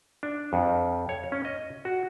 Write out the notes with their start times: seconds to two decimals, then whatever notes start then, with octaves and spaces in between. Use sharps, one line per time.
0.23 D4
0.53 F2
1.09 C#5
1.32 C#4
1.45 D#5
1.85 F#4